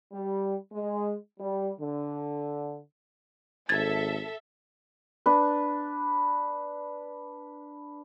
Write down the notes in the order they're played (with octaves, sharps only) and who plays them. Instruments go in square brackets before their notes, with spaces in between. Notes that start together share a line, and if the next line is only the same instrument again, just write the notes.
[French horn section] G3
G#3
G3
D3
[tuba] G#1 [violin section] A4 E5 [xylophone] G#6 A6
[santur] D4 B4